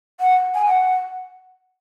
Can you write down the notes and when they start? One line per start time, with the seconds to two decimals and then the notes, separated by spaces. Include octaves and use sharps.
0.20 F#5
0.55 G#5
0.66 F#5